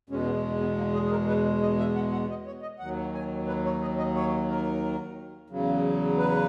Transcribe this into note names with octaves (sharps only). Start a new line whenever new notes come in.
E2 B2 G#3 C#4
B3
B3
A#3
G#4
G#4
A#4
B4
D#5
E5
F#5
F#5
D#5
C#5
D#5
D#2 D#3 F#3 F#5
G#5
B4
C#5
D#5
D#5
C#5
A#4
E2 C#3 F#3
B4